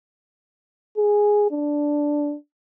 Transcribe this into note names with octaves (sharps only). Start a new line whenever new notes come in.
G#4
D4